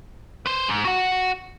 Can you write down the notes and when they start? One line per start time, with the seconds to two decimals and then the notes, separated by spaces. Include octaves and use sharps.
0.46 B4 C5
0.68 G#2
0.85 F#4 F#5